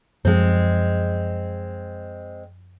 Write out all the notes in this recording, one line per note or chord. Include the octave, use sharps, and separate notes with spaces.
F#2 F3 G#3 C4